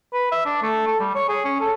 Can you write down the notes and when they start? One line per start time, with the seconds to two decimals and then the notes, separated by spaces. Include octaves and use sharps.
0.13 B4
0.32 E5
0.45 D4
0.62 A3
0.87 A4
1.00 G3
1.15 C#5
1.28 G#4
1.45 C#4
1.60 A4